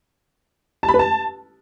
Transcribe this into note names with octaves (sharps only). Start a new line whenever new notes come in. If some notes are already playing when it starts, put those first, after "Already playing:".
A5
B5
B4
A5